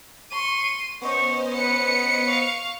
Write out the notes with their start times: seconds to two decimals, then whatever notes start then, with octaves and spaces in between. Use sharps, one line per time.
0.31 C6 C#6 D#7
1.02 B3 C#4 C5 D#5 C#6
1.54 B4 C#7
2.26 F5 C#6